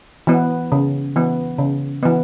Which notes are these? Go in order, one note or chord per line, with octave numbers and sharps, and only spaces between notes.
E3 B3
C#3
E3 B3
C#3
E3 B3